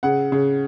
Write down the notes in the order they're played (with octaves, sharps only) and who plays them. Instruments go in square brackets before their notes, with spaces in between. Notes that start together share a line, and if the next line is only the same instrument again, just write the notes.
[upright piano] C#3 F#5
C#3